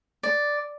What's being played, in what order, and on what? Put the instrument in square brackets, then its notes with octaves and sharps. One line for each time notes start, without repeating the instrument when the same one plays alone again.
[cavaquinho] D5